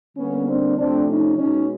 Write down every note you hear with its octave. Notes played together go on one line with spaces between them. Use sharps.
D3 G3 A#3 B3 C#4
C4 D4
C3 F3 A3 C4 D4
C#4 D#4
B2 G#3 C#4 D#4